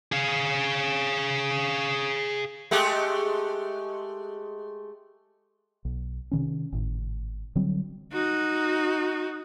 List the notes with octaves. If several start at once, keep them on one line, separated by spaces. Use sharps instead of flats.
G#4 F5
G#3 A3 G4
B1
C3 D#3 C#4
G#1 A2
D3 F#3 G3 C4
D#4 F#4